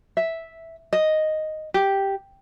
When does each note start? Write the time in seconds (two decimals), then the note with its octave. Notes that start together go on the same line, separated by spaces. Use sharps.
0.17 E5
0.93 D#5
1.74 G4